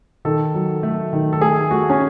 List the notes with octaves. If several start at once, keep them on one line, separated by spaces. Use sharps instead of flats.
D#3 A4
F#3
A3
D#3
A4
A3 G#4
A3 F#4
C#4